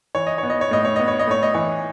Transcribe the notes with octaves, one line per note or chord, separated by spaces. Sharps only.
E3 C#5
D#5
B3 C#5
D#5
C#5
A2 D#5
C#5
B3 D#5
C#5
D#5
A2 C#5
D#5
E3 C#5